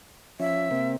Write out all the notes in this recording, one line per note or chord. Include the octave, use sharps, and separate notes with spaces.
F3 C#4 E5
C3 A#3 C4